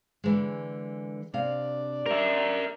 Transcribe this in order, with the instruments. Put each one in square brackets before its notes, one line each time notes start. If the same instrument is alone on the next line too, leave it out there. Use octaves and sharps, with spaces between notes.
[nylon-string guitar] D3 E3 G#3
[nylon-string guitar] C3 F5 [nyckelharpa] D4 D5
[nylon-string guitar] G4 [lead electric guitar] A#4 E5